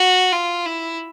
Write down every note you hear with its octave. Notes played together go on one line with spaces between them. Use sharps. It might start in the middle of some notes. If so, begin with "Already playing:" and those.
Already playing: F#4
F4
E4